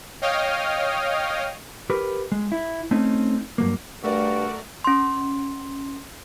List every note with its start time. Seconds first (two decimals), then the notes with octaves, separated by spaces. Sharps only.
0.22 C#5 D#5 F5 G5 D#6 F6
1.90 G4 A#4 B4
2.32 G#3
2.52 E4
2.91 A3 C4 C#4 D#4
3.58 G2 F#3 A#3
4.04 G2 A3 F#4 A#4 D5
4.84 C#4 C6